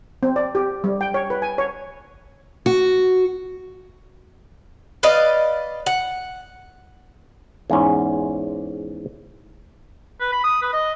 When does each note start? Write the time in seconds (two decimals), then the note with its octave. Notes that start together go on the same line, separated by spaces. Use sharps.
0.23 C4
0.36 D5
0.55 G4
0.84 G3
1.01 G5
1.14 C#5
1.30 B4
1.42 G#5
1.58 C#5
2.66 F#4
5.03 B4 D5 D#5 F5
5.86 F#5
7.70 E2 G#2 C#4
10.20 B4
10.32 B5
10.44 D#6
10.62 B4
10.73 D#5